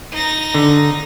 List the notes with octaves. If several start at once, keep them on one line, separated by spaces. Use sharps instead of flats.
D#4 A#6
D3